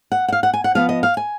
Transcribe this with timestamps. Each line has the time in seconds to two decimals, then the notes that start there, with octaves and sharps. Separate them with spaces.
0.12 F#5
0.28 F#5
0.32 F5
0.43 F#5
0.53 G#5
0.64 F#5
0.75 F3 B3 F5
0.89 D#5
1.03 F5
1.17 G#5